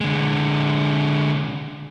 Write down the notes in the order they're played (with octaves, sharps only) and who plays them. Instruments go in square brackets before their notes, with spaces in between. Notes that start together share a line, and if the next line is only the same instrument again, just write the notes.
[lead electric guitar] D3 G#3